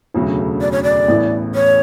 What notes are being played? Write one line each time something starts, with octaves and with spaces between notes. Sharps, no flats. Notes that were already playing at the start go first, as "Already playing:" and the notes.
E1 D2 C#3 F#3 A3
D5
C#5
D5
A1 A2 E3 B3
C#5